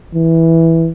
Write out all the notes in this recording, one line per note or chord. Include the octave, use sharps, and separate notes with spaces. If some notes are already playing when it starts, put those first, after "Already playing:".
E3